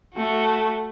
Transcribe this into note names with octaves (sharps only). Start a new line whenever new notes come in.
A3 F#4